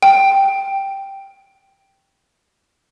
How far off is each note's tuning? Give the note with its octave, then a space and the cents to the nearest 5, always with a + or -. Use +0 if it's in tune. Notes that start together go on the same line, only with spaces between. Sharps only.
G5 +0